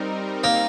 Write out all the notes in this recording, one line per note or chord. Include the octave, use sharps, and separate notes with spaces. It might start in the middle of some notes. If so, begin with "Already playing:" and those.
Already playing: G3 C4 D#4 A#4
A#3